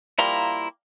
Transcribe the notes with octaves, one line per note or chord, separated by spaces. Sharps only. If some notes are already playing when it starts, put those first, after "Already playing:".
F3 G3 A#3 E4 A#5 C6